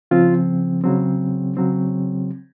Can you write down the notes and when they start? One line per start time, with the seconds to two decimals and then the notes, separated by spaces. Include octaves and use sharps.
0.11 C#3 F3 C4 F4
0.84 C#3 F#3 C4
1.57 C#3 F#3 C4